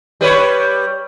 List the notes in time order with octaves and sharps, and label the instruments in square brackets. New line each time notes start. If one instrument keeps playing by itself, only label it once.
[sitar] G3 B4 C#5